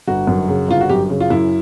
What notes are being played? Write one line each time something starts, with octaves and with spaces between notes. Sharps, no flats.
G1 F#4
F#2
C#3
G1 F4
F#4
F#2 G4
C#3
F4
F#2 E4